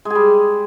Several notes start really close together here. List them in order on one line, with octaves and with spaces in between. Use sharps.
G#3 G#4 G3